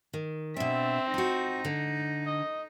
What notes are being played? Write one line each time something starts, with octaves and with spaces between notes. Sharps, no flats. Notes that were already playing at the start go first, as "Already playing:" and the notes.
D#3
B2 C4 D4 E5
D#4 F4 F#4
D3
D#5